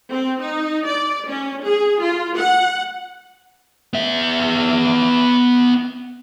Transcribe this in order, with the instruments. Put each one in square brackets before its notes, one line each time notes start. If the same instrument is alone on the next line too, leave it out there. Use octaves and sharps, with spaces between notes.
[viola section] C4
D#4
D5
C#4
G#4
F4
F#5
[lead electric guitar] B3 E5